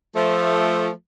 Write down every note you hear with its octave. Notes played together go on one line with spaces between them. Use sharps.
F3 A3